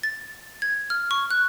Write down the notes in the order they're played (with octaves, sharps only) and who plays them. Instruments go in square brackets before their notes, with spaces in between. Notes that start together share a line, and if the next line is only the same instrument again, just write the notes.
[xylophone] A6
G#6
F6
C#6
F#6